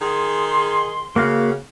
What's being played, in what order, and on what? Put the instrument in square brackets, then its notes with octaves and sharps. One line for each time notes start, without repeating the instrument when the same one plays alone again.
[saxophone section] D#3 G#4 [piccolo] C6
[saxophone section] C#3 [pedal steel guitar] A#3 F#4 F5